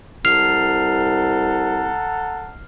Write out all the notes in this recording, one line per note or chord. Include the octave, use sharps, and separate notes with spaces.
C2 A4 F#5 A#5 F6 C7 F7